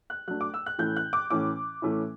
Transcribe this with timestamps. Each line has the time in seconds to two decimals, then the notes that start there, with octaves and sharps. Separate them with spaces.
0.10 F#6
0.28 F#3 A3 D4 F#6
0.41 D6
0.54 E6
0.66 F#6
0.78 A2 E3 A3 C#4 E4 G6
0.96 F#6
1.13 D6
1.30 A2 E3 A3 C#4 E4 D6
1.82 A2 E3 A3 C#4 E4